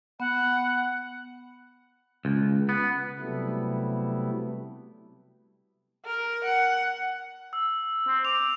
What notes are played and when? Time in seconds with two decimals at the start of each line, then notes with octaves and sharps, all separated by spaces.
0.20 B3 F#5
2.25 C#2
2.69 B3
3.18 C3 F#3 G3 A3 B3 E4
6.06 A#4
6.45 F#5
7.53 E6
8.07 C4
8.25 D6 F7